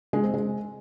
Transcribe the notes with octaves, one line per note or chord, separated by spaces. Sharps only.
G#3
C4
G#3